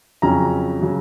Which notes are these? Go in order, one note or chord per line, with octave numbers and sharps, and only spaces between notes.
F2 C#3 F#3 C#4 A#5
C#3 F#3